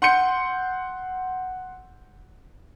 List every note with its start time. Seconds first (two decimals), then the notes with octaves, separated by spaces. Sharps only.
0.02 F#5 C6 G6 C#7